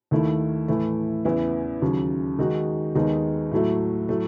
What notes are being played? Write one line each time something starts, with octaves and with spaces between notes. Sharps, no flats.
D#2 D#3 A3 E4
A2 E3 A3 E4
E2 C#3 E3 B3 E4
D#2 C#3 F#3
D#3 G#3 D#4 F#4
D#2 D#3 G#3 B3 D#4
A2 F#3 A3
A2 F#3 A3